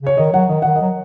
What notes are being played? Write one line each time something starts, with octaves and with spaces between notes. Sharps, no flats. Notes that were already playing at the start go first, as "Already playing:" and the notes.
C#3 C#5
D#3 D#5
F#3 F#5
D#3 D#5
D#3 F#5
D#5
F#3